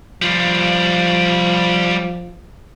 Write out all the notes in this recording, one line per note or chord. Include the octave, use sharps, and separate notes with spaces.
F3 G3 F4